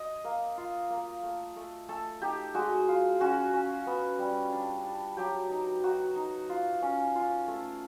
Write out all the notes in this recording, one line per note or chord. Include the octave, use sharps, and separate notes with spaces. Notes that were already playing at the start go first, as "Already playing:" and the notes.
Already playing: D#5
A#3
F4
A#3
A3
A3
A3 A4
D#4 G4
G#3 F#4
F4
C#4 F#4
C#4
B3
G3
D4
D4
F#3 G4
D#4
D#4 F#4
D#4
F4
C#4
F4
A3